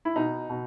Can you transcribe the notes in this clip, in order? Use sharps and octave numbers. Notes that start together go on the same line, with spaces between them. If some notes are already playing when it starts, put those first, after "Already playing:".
E4
B2 D#4
B2